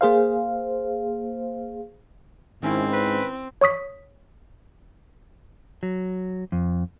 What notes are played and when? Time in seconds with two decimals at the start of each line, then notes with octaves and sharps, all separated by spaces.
0.01 A#3 G#4 C5 F5
2.63 G#2 D#3 C4 C#4 E4
2.92 B4
3.61 C#5 C#6 D#6 B6
5.83 F#3
6.52 F2